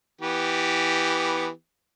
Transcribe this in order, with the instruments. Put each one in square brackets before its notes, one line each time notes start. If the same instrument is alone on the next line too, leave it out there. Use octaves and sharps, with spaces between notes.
[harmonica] E3 B3 G4